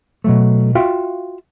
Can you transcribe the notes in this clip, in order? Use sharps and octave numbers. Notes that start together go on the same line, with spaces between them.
B2 F#3 A3
F4 F#4 E5 F5 G5